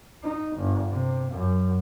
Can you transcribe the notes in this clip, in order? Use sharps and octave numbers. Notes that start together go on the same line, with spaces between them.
D#4
G1
C3
F#2